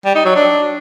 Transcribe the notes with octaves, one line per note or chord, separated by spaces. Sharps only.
G3
D#4
F#3
D4